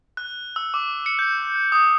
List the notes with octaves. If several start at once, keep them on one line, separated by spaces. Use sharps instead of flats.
F#6
E6
D6
C#7
G6
F#6
D#6